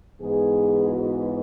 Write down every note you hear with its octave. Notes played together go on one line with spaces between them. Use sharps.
G#2 E3 B3 G#4
F#4